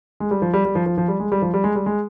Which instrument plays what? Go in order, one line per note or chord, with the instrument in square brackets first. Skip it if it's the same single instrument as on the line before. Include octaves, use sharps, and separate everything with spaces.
[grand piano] G#3
G3
F3
G3
G3
F3
F3
F3
G3
G#3
G3
F3
G3
G#3
G3
G#3